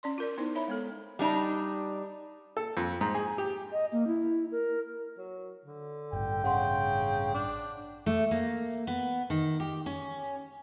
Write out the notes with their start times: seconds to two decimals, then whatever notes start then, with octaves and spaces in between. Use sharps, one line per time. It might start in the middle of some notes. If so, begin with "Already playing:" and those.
0.03 C#4 D5 C6
0.18 F4 A#4 D5
0.38 B3 D#4 E4 C5
0.55 C#5 E5 A#5 B5
0.68 G#3 B3 A4
1.19 G3 D4 D#4
2.57 A4
2.77 F2
3.01 G#2
3.14 G#4
3.38 G4
3.72 D#5
3.92 A#3
4.07 E4
4.52 A#4
5.18 F#3
5.65 D3
6.13 A1 G2 G5
6.44 C#3 F#5 C6
7.35 D4
8.06 A3
8.31 A#3
8.87 B3
9.30 D#3
9.60 G4
9.86 C#4